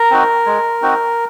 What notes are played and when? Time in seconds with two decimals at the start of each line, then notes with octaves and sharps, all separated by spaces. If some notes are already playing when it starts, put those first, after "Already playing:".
Already playing: A#4
0.11 C4 D#4 F#4
0.46 G#3
0.82 C4 D#4 F#4